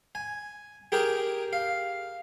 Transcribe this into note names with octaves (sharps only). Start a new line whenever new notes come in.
G#5
G4 G#4 A#4 G5
F5